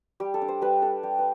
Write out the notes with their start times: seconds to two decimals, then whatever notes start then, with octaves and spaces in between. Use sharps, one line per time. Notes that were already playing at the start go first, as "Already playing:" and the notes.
0.20 G3 G4
0.34 A4
0.42 D4
0.48 C5
0.61 G3 B4
0.82 D4 A4
1.03 G3 G4
1.19 B4